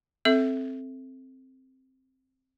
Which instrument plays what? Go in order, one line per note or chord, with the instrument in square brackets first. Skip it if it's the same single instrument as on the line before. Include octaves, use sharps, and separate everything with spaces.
[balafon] C4 A4 E5